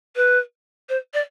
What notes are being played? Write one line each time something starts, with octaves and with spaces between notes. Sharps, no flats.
B4
C5
D5